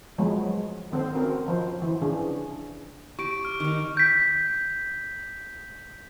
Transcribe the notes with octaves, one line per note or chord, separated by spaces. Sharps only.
F3 F#3 G#3 A3 B3
D#3 C4 A4 C5
C4 C#4 F#4 A#4
F3 C5
E3
C#3 C#4 D4 G#4
G4 C#6 D7
F6
D#3 D#4
G6 B6